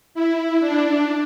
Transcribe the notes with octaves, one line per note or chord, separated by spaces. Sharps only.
E4
D4